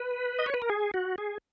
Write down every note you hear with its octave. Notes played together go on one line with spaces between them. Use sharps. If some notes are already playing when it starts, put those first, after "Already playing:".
Already playing: B4
D#5
C#5
B4
A#4
G#4
F#4
G#4